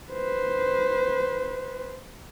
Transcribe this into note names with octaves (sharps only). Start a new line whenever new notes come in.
B4 C5